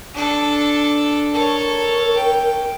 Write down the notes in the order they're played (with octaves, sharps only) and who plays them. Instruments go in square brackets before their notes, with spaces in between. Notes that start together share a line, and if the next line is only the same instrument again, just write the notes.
[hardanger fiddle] D4 A4
[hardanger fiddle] A4 C#5 [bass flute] A#4
[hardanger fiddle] G5